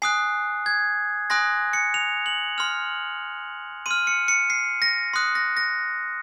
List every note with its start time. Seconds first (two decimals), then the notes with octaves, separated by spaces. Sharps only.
0.02 G#5 D#6 F#6 C7
0.66 G#6
1.30 G#5 C6 D#6 F#6 A#6
1.73 C#7
1.94 F7
2.26 F#7
2.58 C6 F6 F7
3.86 C6 F6 D#7
4.07 C#7
4.28 C#7
4.50 C7
4.82 A#6
5.14 C6 D#6 F#6
5.35 A#6
5.57 A#6